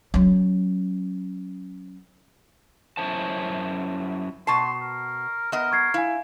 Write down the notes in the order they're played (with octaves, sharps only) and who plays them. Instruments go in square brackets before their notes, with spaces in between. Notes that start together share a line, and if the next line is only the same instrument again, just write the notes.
[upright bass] F#3 C#4
[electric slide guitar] F#2 G#3 C#4 E4 C5 A5
[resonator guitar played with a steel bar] B2 A5 [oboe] C6 [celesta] C#6 C7
[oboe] A#4
[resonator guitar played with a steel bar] B3 D#5 [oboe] A#4
[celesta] C#6 G#6 C7
[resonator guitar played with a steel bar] E4 [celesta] F5 G#5